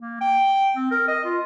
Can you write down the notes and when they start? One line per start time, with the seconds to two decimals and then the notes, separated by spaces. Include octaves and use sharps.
0.01 A#3
0.21 G5
0.76 C4
0.91 A#4
1.08 D#5
1.25 F4